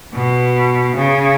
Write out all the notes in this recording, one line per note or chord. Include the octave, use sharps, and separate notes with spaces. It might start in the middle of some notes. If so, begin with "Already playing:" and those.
B2
C#3